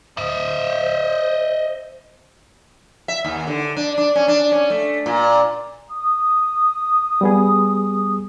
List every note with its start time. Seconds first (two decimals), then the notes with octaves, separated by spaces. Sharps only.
0.17 C5 D#5 E5
3.08 E5
3.24 D#2
3.47 D3
3.76 D4
3.98 D4
4.15 C#4
4.28 D4
4.52 C#4
4.70 A3
5.06 A#2
5.90 D#6
7.21 G3 B3 G#4